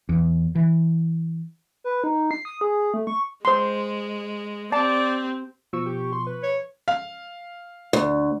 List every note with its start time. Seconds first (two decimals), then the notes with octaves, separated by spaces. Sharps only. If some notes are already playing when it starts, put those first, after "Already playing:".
0.09 E2
0.55 E3
1.84 B4
2.04 D#4
2.31 C7
2.45 D#6
2.61 G#4
2.94 A3
3.07 C#6
3.45 G#3 C5 C6
4.72 C4 G4 D5 A5
5.73 B2 F3 C#6 E6
5.86 G4
6.13 C6
6.27 B4
6.43 C#5
6.88 F5
7.93 D2